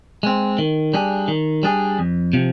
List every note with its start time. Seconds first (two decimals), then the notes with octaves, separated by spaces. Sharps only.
0.23 G#3 C4
0.59 D#3
0.94 G3 D4 G#4
1.28 D#3
1.63 G3 D4 G#4
1.99 F2
2.33 C3 F3